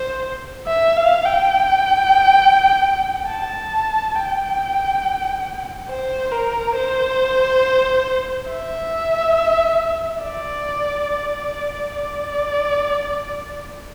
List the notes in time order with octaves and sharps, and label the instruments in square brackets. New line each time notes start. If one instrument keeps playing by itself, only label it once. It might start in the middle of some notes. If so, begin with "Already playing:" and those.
Already playing: [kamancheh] C5
E5
F5
G5
A5
G5
C5
A#4
C5
E5
D5
D5